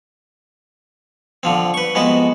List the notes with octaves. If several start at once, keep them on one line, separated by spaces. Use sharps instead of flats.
D3 F3 C4
B4 C#6
F2 G#3 B3 F#4 B4